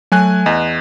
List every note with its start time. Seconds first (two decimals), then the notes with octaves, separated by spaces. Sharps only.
0.12 F#3 A3 G#5 F#6
0.46 E2 D#5